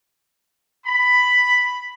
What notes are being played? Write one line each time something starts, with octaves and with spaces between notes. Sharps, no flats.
B5